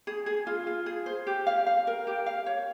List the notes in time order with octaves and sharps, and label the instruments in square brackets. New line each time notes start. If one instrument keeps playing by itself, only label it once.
[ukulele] G#4
G#4
F4
F4
G#4
C5
G4
F5
F5
A#4
G4
F5
C#5